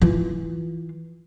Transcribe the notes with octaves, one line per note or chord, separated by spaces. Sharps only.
E3 F4